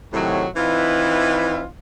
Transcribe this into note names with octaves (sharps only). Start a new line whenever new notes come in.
A2 C3 D#3 F#3
E3 C4 D#4 F4 B4 E5